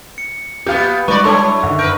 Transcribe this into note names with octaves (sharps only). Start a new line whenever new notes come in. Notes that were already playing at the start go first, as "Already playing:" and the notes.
C#7
A#2 B3 G4 F5 G6
G3 G#3 D#4 F#4 B4 D5 C#6
F#3 D4 E4 A4 C#5 C6
F#2 D3 D#3
A#4 B4 G6